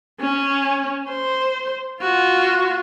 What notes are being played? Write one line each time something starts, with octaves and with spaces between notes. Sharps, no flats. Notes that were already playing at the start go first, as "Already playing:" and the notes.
C#4
C5
F4 F#4